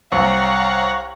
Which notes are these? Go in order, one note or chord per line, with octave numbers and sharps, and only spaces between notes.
C2 C#5 F5 F#5 A#5